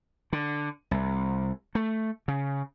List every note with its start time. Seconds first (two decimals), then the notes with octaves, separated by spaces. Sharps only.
0.33 D3
0.91 C2
1.75 A3
2.28 C#3